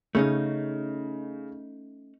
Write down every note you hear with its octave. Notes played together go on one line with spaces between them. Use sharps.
C#3 A3 C#4 D#4